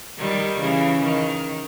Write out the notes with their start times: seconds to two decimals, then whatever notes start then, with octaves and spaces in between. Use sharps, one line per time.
0.18 D#3 G3
0.60 C#3 E3
1.02 D#3